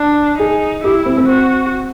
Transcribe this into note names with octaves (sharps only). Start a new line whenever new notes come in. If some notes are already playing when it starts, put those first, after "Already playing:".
Already playing: D4
D#4 G#4
E4 G4
C4
C4
F#4